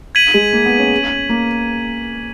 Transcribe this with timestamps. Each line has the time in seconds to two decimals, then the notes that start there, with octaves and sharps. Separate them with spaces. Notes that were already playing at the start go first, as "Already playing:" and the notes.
0.15 G#6 B6 D#7 F#7
0.34 G#3
0.53 A#3
0.66 B3
0.78 C#4
1.29 A#3